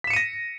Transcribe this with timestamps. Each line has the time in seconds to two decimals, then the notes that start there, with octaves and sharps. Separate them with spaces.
0.04 B6
0.07 E7
0.10 C#7
0.13 D#7
0.16 A#6